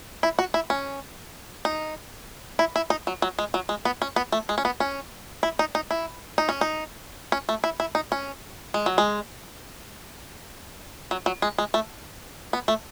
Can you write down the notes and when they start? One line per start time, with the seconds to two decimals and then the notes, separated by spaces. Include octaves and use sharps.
0.23 E4
0.39 F#4
0.54 E4
0.70 C#4
1.65 D#4
2.59 E4
2.76 E4
2.90 D#4
3.07 F#3
3.22 F#3
3.39 G#3
3.54 F#3
3.69 G#3
3.85 B3
4.02 C#4
4.16 B3
4.32 A3
4.49 G#3
4.58 C#4
4.65 B3
4.80 C#4
5.43 E4
5.59 D#4
5.75 D#4
5.91 E4
6.38 D#4
6.49 C#4
6.61 D#4
7.32 C#4
7.49 A3
7.64 E4
7.80 E4
7.95 D#4
8.12 C#4
8.74 G#3
8.86 F#3
8.98 G#3
11.11 F#3
11.26 F#3
11.42 G#3
11.58 G#3
11.74 A3
12.53 B3
12.68 A3